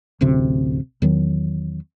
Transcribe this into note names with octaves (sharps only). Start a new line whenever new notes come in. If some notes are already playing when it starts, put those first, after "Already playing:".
D1 A1 D2 C3
E2 D#3 F#3